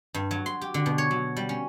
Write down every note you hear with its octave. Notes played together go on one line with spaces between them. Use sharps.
G2
F#3
C6
G4
D3
B2
C#5
F#3
G3
C#4